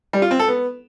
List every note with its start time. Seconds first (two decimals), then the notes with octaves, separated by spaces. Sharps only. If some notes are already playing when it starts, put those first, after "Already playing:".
0.13 G3
0.22 F4
0.31 C4
0.39 A4
0.48 B3